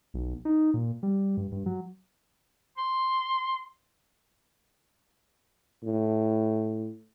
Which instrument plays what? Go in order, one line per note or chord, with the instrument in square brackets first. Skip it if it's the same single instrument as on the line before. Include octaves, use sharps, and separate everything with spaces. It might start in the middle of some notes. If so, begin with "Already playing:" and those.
[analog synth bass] B1
D#4
A#2
G3
G2
G2
F#3
[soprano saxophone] C6
[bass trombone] A2